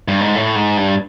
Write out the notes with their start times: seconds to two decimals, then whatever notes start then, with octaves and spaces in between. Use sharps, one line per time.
0.08 G2
0.21 G#2
0.35 A2
0.56 G#2
0.77 G2